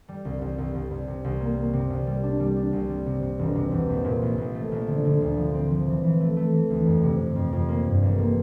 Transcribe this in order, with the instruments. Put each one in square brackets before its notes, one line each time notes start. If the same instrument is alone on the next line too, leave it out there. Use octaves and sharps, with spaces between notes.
[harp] G3
C2
C2
C2
C2
C2
C3
C2
A#3
A#3
C3
C2
G3
D4
G3
D4
C2
G3
C3
C3
E1
C3
E2
A#1
A#2
A#1
A#1
A3
A#1
D3
D3
D2
F3
C4
F3
E3
E3
A3
A3
E3
D2
F2
C3
C3
F2
F2
A#3
G2
A1
A#3